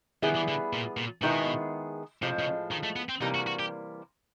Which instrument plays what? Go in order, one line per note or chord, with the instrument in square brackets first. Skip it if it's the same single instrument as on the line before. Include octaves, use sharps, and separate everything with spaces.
[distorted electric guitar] D#3 [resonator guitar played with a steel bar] G3 B3 E4 G#4
[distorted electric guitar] E3
D3
A#2
A#2
[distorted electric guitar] B2 [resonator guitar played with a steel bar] D#3 G#3 B3 E4 G#4
[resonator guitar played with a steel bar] A2 F3 G#3 [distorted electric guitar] C3
[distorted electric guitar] C#3
D#3
A3
B3
C4
[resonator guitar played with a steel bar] C3 E3 G3 A#3 [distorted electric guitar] D#4
[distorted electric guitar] F#4
F#4
G4